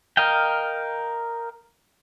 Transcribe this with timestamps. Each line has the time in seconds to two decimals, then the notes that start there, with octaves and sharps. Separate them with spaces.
0.17 A#4 D#5 F5 G5